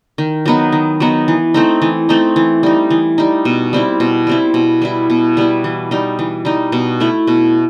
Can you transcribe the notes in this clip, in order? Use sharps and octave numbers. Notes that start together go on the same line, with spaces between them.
D#3
F#3 B3 D#4
D#3
F#3 B3 D#4
E3
A3 C4 D#4
E3
A3 C4 D#4
E3
G3 D#4
E3
G3 D#4
B2
G3 C4 E4
B2
G3 C4 E4
B2
G3 B3 E4
B2
G3 B3 E4
E3
G3 D#4
E3
G3 D#4
B2
A3 E4
B2